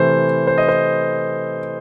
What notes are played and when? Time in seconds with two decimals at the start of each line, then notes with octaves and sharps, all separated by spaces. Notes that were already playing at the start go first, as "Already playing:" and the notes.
Already playing: C3 E3 A3 C5
0.47 C5
0.58 D#5
0.68 C5